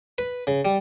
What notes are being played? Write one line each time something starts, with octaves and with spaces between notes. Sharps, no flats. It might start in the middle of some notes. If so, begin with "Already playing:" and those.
B4
C#3
G3